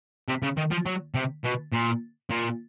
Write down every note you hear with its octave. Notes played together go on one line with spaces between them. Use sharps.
C3
C#3
D#3
F3
F#3
C3
B2
A#2
A#2